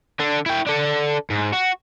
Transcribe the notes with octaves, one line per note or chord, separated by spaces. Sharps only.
D3 D4
E4 G5
D4 A4
G#2
F#4